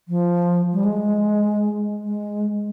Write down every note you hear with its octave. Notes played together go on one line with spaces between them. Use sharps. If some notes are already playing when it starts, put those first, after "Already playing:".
F3
G3
G#3
G#3